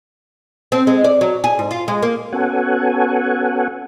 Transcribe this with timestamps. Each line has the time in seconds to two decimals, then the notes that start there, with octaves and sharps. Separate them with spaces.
0.72 C4
0.87 G#3
1.04 D5
1.21 F#3
1.44 G#4
1.59 G#2
1.71 F4
1.88 G#3
2.03 A#3
2.32 B3 C#4 F#4 A4 F#5 G#5